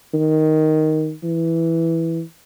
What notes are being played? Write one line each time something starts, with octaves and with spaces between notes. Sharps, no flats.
D#3
E3